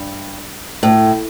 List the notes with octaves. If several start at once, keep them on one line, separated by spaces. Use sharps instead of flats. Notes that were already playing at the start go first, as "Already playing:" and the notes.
Already playing: G2
A2